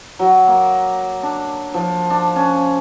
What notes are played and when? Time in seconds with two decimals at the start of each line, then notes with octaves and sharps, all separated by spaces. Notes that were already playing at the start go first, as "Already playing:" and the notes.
0.19 F#3
0.48 A#3
1.23 D4
1.74 F3
2.10 D4
2.36 C#4